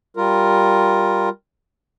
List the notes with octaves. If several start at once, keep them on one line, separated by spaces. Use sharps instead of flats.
G3 F4 A#4